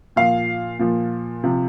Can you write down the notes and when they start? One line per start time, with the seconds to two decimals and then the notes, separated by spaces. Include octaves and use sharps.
0.16 A#2 F3 F5
0.79 A#2 F3
1.44 C3 F3